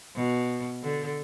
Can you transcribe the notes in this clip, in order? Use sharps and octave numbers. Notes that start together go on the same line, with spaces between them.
B2
D3